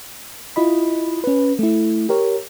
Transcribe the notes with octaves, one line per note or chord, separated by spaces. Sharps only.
E4 F4 D#5 B5
C#4 B4
A3 E4
G4 A#4 C#5